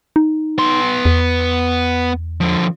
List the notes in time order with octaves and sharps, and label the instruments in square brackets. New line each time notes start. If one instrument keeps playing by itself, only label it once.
[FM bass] D#4
[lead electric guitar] B3 C6
[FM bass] E2
[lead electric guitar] D3 F3